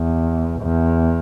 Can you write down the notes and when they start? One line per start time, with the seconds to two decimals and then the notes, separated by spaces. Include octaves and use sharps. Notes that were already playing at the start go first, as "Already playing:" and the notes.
Already playing: E2
0.61 E2